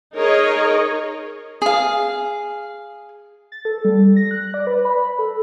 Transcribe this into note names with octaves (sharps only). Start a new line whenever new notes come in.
D#4 G#4 A#4 C#5 D#5
G#4 F5
A6
A4
G3
A#6
F#6
D5
B4
B5
A4